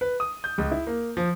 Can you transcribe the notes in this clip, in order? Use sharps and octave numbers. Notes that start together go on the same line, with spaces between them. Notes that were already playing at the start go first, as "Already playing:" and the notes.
B4
D#6
G6
C#2
E4
A#3
F3